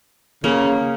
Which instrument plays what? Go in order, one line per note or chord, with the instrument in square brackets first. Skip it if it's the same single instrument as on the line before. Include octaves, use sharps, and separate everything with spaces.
[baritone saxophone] C#3 [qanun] A#3